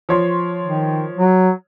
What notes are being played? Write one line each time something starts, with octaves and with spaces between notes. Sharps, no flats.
F3 C#5 C6
D#3
F#3